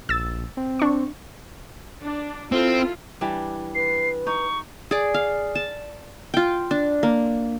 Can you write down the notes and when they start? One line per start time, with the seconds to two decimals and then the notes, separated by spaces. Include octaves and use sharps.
0.09 A#1 E6 A6
0.57 C4
0.79 D4 C#6
2.03 D4
2.52 C4 E4 F4 A4
3.21 E3 G3 D4
3.75 B4 C7
4.27 D#4 C#6
4.91 G#4 D5
5.14 F5
5.55 A5
6.34 F4 G5
6.71 D4
7.03 A#3